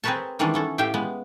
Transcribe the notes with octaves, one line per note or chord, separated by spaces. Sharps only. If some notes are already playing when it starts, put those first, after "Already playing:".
C4 G#4 A#4 B4 C#5 A5
D#3 E3 G3 G#3 C#4 D4
B3 C#4 A4
A2 G4 E5 F5 G5
G#3 B3